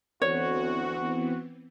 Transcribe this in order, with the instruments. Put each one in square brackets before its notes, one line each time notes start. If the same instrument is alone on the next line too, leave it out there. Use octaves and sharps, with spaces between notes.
[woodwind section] D2 [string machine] E3 B3 C4 [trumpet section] F#4 [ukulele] C#5